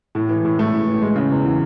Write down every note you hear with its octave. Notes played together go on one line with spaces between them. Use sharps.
A2
E3
A2
A3
A2
E3
G#3
C#3
E2
E3